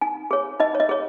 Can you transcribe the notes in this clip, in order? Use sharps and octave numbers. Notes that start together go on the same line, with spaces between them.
D#4 G#5
G#4 C#5
D#4 D#5
C#5
D#5
G#4 C#5